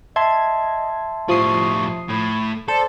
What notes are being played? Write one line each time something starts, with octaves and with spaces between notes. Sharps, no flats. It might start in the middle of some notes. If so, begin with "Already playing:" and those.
D#5 E5 A5 C6 G#6
A2 F3 G3 C#6 D#6 C7
A2 B5
A4 C5 D5 A5